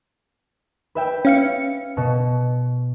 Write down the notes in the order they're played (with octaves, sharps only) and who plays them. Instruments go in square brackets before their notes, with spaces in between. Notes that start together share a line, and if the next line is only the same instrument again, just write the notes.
[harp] B4 E5 G5
[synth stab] C#4 F5 C#7
[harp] B2